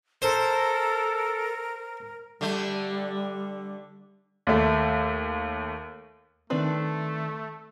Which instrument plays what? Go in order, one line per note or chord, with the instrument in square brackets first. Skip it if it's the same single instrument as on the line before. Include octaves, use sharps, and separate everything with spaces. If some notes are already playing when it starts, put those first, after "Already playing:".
[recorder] A4 [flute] A#4 [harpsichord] C5
[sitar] D3 A3 [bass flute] G3
[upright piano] D#2 A3
[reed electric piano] D#3 C6 [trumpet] A3 [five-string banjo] C4 D4 B4